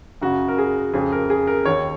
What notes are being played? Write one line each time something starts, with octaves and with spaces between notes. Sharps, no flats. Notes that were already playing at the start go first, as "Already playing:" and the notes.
F#2 C#3 F#4
A#4
G#4
F2 C#3 G#4
A#4
G#4
A#4
D#2 D#3 C#5